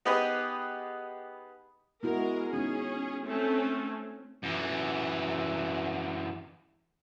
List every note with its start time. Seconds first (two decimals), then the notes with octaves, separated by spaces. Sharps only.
0.05 B3 D#4 G4 G#4 B4 D#5
2.03 G#3 B3 E4 F#4 A#4
2.53 G#3 B3 C#4 D#4 G#4
3.25 A3 C4 C#4
4.43 F#2 E3